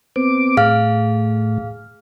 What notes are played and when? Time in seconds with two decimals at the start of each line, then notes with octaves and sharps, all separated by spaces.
0.16 B3 C4 D6
0.57 A2 G#4 F5 F6